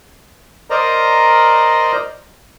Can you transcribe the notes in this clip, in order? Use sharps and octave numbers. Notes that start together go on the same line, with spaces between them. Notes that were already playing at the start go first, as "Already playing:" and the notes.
A#4 C5 D5 D#5 A#5